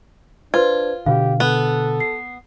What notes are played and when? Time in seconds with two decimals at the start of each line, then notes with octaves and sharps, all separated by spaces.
0.54 D4 F4 B4 C5 G#6
1.06 B2 D3 G4 F5
1.40 B3 A4 F#6
2.00 C7